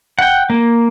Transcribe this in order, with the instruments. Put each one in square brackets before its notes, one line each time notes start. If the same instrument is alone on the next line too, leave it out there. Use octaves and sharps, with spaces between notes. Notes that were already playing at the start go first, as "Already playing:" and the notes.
[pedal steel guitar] F#5 G5
A#3